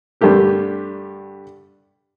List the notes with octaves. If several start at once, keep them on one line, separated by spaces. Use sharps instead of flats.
G2 D3 A3 G4 A#4